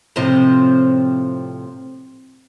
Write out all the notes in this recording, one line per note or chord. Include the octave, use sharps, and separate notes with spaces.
A2 C3 F3